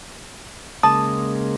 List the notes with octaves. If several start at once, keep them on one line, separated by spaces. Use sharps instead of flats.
C#3 G#3 A#3 A5 D#6